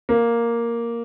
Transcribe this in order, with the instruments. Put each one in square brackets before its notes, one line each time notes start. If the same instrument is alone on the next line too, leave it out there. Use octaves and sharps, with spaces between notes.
[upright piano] A#3